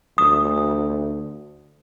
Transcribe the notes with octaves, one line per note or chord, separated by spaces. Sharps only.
D2 D#6